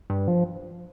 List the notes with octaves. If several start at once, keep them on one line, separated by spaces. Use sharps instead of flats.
G2
F3